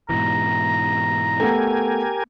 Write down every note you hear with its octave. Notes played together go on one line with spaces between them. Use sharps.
G#2 B2 E3 A#5
A3 B3 G4 A#4 G#5